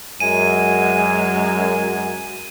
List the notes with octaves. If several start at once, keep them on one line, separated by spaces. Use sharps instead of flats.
F#2 G#3 G#5 D#7